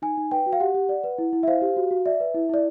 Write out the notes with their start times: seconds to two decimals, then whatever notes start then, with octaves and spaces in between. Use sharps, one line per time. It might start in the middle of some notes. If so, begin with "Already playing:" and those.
0.02 D#4 G#5
0.17 D#4
0.31 B4 G5
0.46 F#4
0.53 F5
0.60 G4 F#5
0.74 G4
0.89 D5
1.04 B4
1.18 E4
1.33 E4
1.43 E5
1.48 C5 F5
1.62 G4
1.77 F#4
1.91 F#4
2.06 D5 E5
2.20 B4
2.34 E4
2.49 E4 D5